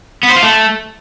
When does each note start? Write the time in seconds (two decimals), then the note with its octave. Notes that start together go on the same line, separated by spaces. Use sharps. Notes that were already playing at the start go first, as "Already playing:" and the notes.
0.23 B3
0.30 C5
0.36 F4
0.43 A3